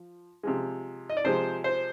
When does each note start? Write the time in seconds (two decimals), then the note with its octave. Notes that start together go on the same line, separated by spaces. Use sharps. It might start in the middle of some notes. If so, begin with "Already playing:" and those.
Already playing: F3
0.43 C3 F3 G#3
1.10 D#5
1.17 D5
1.24 C3 F3 G#3 C5
1.64 C5